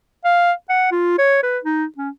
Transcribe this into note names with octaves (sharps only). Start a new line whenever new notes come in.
F5
F#5
F4
C#5
B4
D#4
C#4